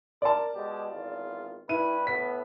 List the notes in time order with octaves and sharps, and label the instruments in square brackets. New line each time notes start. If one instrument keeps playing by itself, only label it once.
[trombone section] A#4 [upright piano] D5 A5
[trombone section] B2 G#3 G4
G#1 E2 F4
[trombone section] G2 B4 [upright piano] E4 D#7
[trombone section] A2 B3 [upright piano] B6